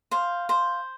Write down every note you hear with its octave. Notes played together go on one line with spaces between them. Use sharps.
C5 F5
C5